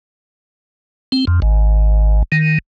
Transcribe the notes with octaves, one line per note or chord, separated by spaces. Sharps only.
C4
F2
G#1
D#3